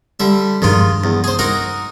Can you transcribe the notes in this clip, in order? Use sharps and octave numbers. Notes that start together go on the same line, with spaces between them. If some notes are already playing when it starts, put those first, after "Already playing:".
D3 G3 E5
G2 D#3 F3 G3 G#3 F4
E2
G#4 C5
D#4 F#4 A#4